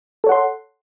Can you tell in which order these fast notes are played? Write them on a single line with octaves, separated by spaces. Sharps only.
A4 C#5 F#5 C6